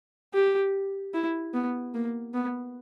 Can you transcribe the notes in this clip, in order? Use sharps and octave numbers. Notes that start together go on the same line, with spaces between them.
G4
E4
B3
A#3
B3